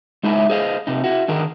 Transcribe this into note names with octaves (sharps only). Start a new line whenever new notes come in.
G#3 D#4 E4 E5
G#4 C5 D#5 F5
C3 D#4
E4 F#4
D3 D#3 G#4 A#4